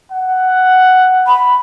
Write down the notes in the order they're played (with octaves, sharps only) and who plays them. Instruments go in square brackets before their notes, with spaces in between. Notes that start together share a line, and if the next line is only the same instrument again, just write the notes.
[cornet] F#5
[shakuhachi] B5